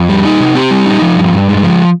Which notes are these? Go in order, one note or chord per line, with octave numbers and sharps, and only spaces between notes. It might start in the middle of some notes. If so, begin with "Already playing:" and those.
Already playing: F2
G3
D#4
C3
C4 G4
G3
D#4
F3
G2
G2
G#3
F3